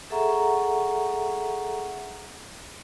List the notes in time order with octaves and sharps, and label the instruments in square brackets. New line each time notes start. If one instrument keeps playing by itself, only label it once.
[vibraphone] G#4 A4 E5 F#5 A#5 C#6